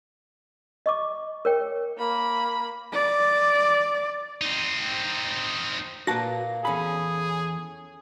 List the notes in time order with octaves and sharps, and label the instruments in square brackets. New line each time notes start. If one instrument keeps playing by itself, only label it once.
[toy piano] D#5 C#6 D6
A#4 C#5 G5
[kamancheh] A#3 B5
[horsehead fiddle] D5
[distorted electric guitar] C4 D#4
[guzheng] A#2 A#3 [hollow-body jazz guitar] F#4 B4 [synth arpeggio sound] A5 A#6
[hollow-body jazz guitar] E2 B5 [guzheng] C#4 A4 [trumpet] G#4